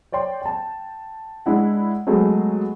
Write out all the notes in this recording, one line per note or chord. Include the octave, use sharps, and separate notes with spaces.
C#5 D5 G5 C6
G5 A5
G#3 D4 E4 F#5
F#3 G#3 A3 B3 G#4